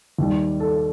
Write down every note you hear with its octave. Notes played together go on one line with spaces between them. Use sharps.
D#2 D#3 G3
A4